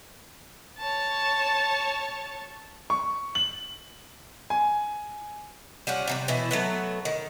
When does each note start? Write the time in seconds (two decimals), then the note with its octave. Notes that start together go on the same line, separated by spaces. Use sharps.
0.78 C#5 A5
2.90 C#6
3.35 F#7
4.50 G#5
5.87 G3 C#4 F4 F#4
6.08 C3 D#3 G3
6.28 B2 E3 E4
6.51 F#3 A3 B3
7.05 D#3